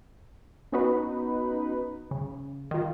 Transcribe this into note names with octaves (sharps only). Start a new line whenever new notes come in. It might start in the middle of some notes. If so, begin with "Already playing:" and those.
B3 C#4 D#4 F#4 B4
C#3
D#3 F4